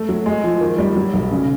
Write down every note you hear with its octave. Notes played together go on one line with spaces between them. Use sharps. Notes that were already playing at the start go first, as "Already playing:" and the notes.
Already playing: A3
F#3
G#3
F3
D#3
G3
F#3
B1
C#3